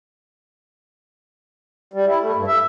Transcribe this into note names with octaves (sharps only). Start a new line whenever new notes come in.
G3
E4
A3
G2
E5